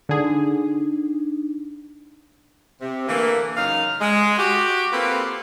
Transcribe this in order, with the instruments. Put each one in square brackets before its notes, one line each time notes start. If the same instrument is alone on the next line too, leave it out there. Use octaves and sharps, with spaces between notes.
[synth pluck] D3 G#4 [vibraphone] D4 D#4
[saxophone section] C3
D3 E3 A3 A#3
F#2 C#3 D#4 F5
G#3
F#4 G4
A#3 C4 F4 G4 A4 B4